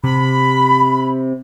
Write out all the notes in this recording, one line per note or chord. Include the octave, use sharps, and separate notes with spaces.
C3 B5